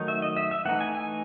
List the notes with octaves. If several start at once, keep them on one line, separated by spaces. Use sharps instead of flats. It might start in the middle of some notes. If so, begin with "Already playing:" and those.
Already playing: D#3 F#3 A3 D#4
E5
D#5
E5
E5
E3 A3 D#4 F#5
G#5
G#5